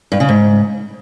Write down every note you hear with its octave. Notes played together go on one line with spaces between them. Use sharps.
G2
C#3
G#2